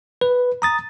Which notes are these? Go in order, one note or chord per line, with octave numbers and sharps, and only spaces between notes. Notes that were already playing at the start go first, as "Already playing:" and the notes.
B4
A#5 D#6 A6